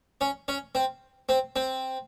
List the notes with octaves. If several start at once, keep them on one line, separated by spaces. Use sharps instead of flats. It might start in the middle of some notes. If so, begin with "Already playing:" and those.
C#4
C#4
C4
C4
C4